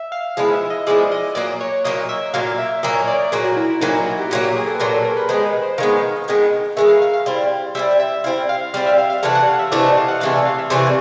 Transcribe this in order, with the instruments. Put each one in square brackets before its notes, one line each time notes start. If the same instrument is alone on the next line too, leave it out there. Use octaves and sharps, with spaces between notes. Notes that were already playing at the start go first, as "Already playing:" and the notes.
Already playing: [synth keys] E5
F5
[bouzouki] F3 G#3 B3 E4 [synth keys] F5
[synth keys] E5
D#5
[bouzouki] F3 G#3 B3 E4 [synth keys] D5
[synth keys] D#5
[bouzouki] A#2 F#3 A#3 [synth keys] D5
[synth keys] C#5
[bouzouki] A#2 F#3 A#3 [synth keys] D#5
[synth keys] E5
[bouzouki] A#2 F#3 A#3 [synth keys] F5
[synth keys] E5
[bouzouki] A#2 F#3 A#3 [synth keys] D#5
[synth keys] C#5
D5
[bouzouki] A#2 F#3 A#3 [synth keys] G#4
[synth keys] F#4
E4
E4
[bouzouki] A#2 F#3 A#3 [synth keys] D#4
[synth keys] E4
F#4
G4
[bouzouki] A#2 F#3 A#3 [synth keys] G4
[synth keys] G4
G#4
A4
B4
[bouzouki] A#2 F#3 A#3 [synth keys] A#4
[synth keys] A4
A#4
B4
[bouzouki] D#3 G#3 B3 [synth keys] C5
[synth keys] B4
C5
[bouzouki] D#3 G#3 B3 [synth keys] F5
[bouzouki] D#3 G#3 B3
[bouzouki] D#3 G#3 B3 [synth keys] E5
[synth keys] F5
F5
F5
[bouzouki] G3 C4 E4
[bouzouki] G3 C4 E4 [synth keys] E5
[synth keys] E5
[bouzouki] G3 C4 E4 [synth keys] F5
[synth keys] F5
[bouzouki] G3 C4 E4 [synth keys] F5
[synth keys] E5
F5
F5
[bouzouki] C3 E3 A3 D4
[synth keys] F#5
F5
E5
[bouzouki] C3 E3 A3 D4
[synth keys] D#5
F5
F#5
[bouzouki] C3 E3 A3 D4 [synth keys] F5
[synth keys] E5
F5
E5
[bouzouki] C3 E3 A3 D4